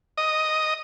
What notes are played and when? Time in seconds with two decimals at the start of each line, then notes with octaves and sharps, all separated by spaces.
0.18 D#5